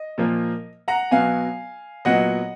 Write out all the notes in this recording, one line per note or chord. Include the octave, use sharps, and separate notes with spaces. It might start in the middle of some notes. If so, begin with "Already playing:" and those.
Already playing: D#5
A#2 F3 A#3
F#5 A#5
B2 F#3 B3 F5 G#5
A#2 F#3 B3 D#5 F#5